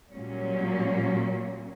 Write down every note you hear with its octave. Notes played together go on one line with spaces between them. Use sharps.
A#2 F#3 G3 A#3 C#4